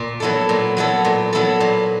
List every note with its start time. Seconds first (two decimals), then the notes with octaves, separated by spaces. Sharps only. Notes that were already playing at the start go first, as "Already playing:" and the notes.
Already playing: A#2
0.20 F#3 B3 E4 A4
0.49 A#2
0.77 F#3 B3 E4 A4
1.05 A#2
1.33 F#3 B3 E4 A4
1.60 A#2